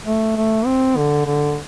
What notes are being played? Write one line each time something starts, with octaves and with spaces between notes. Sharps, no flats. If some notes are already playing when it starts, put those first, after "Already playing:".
A3
A3
C4
D3
D3